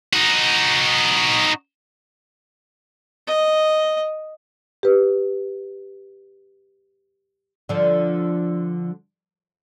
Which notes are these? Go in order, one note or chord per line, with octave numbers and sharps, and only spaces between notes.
D#4 F#4
D#5
G4 B4
D3 F3